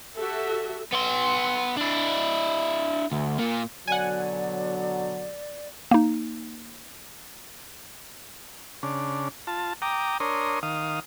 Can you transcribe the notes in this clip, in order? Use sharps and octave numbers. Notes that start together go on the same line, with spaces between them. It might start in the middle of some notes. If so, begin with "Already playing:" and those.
F#4 G4 A4 E5
B3 C6
D4 E4
D2
A#2 A#3
B2 D3 F#3 D5 F#5 G#5
A#3 D#4
C#3 D4
F4 A5
G5 A#5 D6 D#6
D4 A#4 C#5 C6 D#6
D#3 F5 D#6